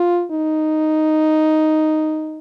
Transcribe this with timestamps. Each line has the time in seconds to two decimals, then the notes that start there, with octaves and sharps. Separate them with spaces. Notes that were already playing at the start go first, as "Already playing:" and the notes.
Already playing: F4
0.32 D#4